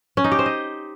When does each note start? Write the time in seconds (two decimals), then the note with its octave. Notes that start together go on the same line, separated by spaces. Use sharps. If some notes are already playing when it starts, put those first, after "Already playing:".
0.17 C#4
0.24 D#4
0.32 G4
0.39 C5
0.46 D#5